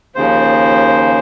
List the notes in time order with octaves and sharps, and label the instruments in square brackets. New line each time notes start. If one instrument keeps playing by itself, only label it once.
[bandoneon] D#2 C#3 F3 C5